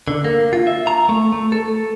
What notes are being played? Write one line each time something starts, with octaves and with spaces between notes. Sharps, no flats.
D3
A#3
F4
E5
A#5
A3
A3
A4